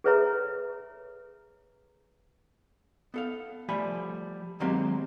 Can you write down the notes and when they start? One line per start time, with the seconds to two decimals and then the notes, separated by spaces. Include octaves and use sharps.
0.04 G#4 A4 B4 C#5 E5 A#5
3.14 B3 A4 F5
3.69 F3 G3 A3 G#5 B5
4.60 D#3 F#3 G#3 A#3 C4 G4